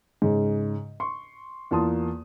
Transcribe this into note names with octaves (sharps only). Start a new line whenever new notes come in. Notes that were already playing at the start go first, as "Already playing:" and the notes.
G#2 C#3 G#3
C6 C#6
E2 A#3 F4 A5 C6 D#6